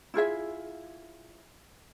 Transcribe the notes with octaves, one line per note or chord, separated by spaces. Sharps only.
E4 F4 G#4 E5